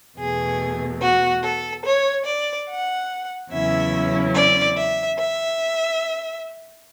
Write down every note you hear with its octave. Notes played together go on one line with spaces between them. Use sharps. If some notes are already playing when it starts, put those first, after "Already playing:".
E2 B2 A3 G#4
F#4
A4
C#5
D5
F#5
E2 C#3 F#3 C#4 E4 E5
D5
E5
E5